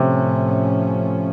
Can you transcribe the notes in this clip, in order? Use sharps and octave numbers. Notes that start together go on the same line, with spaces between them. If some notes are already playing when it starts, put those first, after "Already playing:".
Already playing: A2 C3 F3 A3 C#4